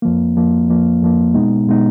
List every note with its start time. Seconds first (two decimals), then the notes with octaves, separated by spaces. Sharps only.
0.02 F2 F3 A#3
0.36 F2 F3 A#3
0.69 F2 F3 A#3
1.02 F2 F3 A#3
1.34 B2 G#3 B3 D#4
1.67 B2 G#3 B3 D#4